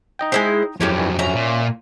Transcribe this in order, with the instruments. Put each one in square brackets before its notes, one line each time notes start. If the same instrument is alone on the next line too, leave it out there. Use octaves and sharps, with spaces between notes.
[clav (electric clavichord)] D#4 D#5 G5
[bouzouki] G#3 E4 C5
[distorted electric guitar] F2 F#3 [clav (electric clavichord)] A2 [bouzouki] C#4 G4 C#5
[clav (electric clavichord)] G#2 E3 G3
[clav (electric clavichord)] C#4 [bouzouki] E5 A#5
[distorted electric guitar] A#2